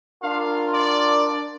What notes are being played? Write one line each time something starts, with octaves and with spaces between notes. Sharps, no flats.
D4 F4 A#4 F5
D5